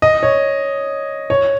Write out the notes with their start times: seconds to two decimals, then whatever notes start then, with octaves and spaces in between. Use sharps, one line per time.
0.02 D#5
0.23 C#5
1.30 C#5